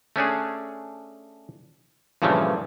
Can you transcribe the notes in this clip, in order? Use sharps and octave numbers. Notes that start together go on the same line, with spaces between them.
A3 C#4 D4 G#4
G2 A#2 C#3 E3 F3 A3